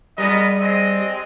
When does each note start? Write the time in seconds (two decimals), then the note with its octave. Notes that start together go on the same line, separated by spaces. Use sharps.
0.18 G3 B3 G#4 A#4 D#5
0.60 G#3 C4 D#5